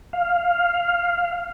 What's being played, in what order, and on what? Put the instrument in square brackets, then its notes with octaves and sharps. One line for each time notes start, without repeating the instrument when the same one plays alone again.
[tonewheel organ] F5